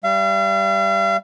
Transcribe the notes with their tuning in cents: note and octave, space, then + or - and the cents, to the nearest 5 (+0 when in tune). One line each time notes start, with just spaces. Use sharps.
G3 +0 F5 -40